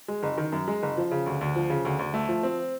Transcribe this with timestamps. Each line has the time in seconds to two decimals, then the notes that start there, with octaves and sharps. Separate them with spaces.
0.08 G#3
0.23 F#1
0.38 D#3
0.52 F#2
0.68 G#3
0.82 F#1
0.97 F3
1.11 C#3
1.26 D2
1.41 D2
1.56 F3
1.70 C#3
1.85 D2
1.99 D2
2.14 A3
2.28 F3
2.43 C4